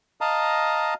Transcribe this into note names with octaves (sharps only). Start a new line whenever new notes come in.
D#5 F5 A5 A#5